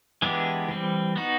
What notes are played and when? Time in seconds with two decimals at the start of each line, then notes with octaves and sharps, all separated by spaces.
0.22 E3 G#3 B3 D4 G4
0.68 E3 G3 C4
1.16 B3 D#4 F#4